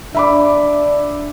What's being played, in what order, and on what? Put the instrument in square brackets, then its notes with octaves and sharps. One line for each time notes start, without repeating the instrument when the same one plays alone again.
[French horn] D4 [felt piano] E5 B5 D6